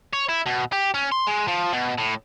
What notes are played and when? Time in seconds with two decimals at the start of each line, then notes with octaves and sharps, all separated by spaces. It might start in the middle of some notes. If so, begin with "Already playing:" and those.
0.13 C#5
0.29 E4
0.46 B2
0.72 G4
0.94 C#4
1.12 C6
1.27 G#3
1.48 F3
1.73 B2
1.98 A2